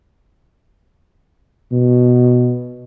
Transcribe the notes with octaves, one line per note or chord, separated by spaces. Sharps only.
B2